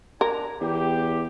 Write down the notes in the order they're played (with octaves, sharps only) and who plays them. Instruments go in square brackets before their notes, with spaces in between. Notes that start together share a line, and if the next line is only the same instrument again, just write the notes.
[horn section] D4 G#5 A#5 [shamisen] A#4
[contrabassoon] E2 [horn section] G4